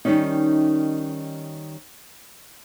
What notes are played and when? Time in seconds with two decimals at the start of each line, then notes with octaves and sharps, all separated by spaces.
0.05 D#3 G3 G#3 C#4 D#4